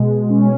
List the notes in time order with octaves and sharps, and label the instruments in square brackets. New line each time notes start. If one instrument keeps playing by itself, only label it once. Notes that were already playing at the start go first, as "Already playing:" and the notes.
Already playing: [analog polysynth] B2 G#3
C#4